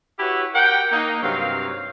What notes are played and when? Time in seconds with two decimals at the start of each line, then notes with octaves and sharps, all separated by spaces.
0.19 E4 F#4 G4 B4 C#5 E5
0.55 G4 A#4 F#5 G5
0.92 A#3 D#4
1.23 G2 C3 F#3 C4 F5